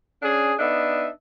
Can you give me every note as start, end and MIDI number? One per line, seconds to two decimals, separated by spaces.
0.23 0.54 61
0.23 0.54 62
0.23 0.54 68
0.59 1.08 59
0.59 1.08 62
0.59 1.08 63
0.59 1.08 76